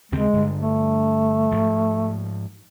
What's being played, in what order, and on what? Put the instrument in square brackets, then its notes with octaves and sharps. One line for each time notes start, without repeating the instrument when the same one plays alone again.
[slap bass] D#2 C#3 C4 [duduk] G#3
[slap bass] G2 D3
[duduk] A3
[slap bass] G#2 F3